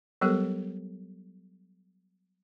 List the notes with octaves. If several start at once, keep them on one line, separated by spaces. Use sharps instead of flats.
F#3 G3 B3 G4 A4 A#4